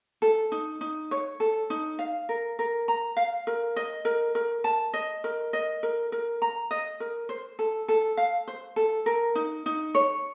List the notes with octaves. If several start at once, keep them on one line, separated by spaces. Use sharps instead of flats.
A4
D#4
D#4
C#5
A4
D#4
F5
A#4
A#4
A#5
F5
A#4
D#5
A#4
A#4
A5
D#5
A#4
D#5
A#4
A#4
A#5
D#5
A#4
C5
A4
A4
F5
C5
A4
A#4
D#4
D#4
C#5